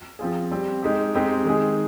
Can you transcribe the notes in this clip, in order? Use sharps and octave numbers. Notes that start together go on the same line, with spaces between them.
F3 C4 F4 G#4
G3 C4 G4
G#3 D#4 G4
G#3 C4 D#4 G4
D#3 G#3 D#4 G#4